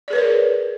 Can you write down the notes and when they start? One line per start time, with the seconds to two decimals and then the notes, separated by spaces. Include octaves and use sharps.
0.08 D5
0.10 G#4
0.13 B4
0.15 C#5
0.18 A#4